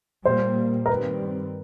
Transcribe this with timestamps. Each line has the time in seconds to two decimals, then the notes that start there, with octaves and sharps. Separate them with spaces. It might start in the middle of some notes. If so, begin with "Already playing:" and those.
0.25 A#2 G3 A#3 C5
0.86 A#4
0.89 G2 D#3 G3 C4 B4